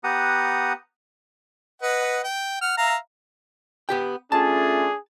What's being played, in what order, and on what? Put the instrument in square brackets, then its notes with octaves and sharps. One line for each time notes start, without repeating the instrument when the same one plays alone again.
[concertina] B3 G4 F#5 A#5 D#6
[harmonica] B4 D#5 F#5
G5
F#5 F6
E5 F5 A#5
[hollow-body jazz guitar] B3 G4 G5
[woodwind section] A3 C#4 F4 [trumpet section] D4 G#4 [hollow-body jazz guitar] A5